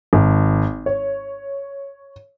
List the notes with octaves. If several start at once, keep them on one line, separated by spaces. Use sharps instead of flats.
G#1
C#5